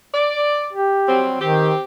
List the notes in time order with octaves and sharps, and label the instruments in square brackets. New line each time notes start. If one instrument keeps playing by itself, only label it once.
[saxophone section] D5
[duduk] G4
[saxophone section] F#3 G3 C4
[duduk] D#3 [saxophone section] C4 G4